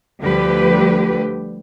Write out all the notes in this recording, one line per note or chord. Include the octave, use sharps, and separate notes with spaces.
D2 D3 F3 G3 G4 B4